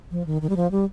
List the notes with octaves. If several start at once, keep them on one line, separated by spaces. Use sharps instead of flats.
F3
D#3
D#3
G3
F3
G3